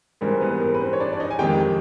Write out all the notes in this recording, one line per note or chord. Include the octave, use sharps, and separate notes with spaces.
G#2 E3 G3 C4 A#4
B3 B4
A#4
B4
C4 C5
C#5
D4 D5
D5
D#4 D#5
G#5
F2 C3 D#3 G#3 G4 G5